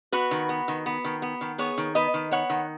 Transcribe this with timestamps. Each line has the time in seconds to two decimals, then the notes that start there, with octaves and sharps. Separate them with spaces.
0.12 B3 F#4 B4
0.31 D#3
0.49 B3
0.68 D#3
0.86 B3
1.05 D#3
1.22 B3
1.41 D#3
1.58 B3 G#4 C#5
1.78 D#3
1.95 B3 B4 D#5
2.14 D#3
2.31 B3 C#5 F#5
2.50 D#3